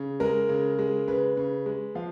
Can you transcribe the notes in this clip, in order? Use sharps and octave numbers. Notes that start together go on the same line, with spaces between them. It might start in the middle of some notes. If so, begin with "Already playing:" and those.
Already playing: C#3
G#3 A#4
C#3
G#3
C#3 B4
C#3
G#3
F3 F5